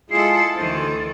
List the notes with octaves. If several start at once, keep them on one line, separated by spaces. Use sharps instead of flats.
G#3 E4 F4 G#4 A4 C7
D2 D#3 E3 C5 A6